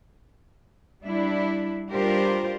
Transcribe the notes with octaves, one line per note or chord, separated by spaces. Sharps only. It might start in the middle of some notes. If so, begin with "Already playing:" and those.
G3 D4 E4
G3 D4 F4 G4 A#4 C5